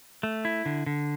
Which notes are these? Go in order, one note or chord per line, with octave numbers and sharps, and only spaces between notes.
A3
E4
D3
D3